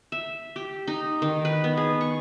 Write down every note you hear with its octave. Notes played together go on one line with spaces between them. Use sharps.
E5
G4
D#4
D#3
B4
B3
G#4
C#6